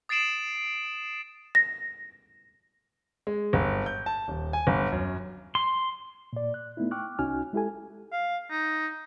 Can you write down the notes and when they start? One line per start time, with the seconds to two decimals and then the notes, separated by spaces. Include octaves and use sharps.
0.09 D#6 A6 C7 D7 E7 F#7
1.55 A#6
3.27 G#3
3.53 G1
3.86 G6
4.06 A5
4.28 D#1
4.53 G#5
4.67 G1
4.92 F#2
5.55 C6
6.33 A#2 D5
6.54 F#6
6.77 A3 B3 D#4 E4
6.91 G5 C#6 D6 F6 F#6
7.19 C2 C#4 D#4 F#4 G#5 F6
7.53 G#3 E4 G4 A4 G#5
8.12 F5
8.51 D#4